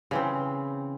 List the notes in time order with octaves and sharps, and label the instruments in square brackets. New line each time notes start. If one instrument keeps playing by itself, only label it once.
[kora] C#3 E3 C4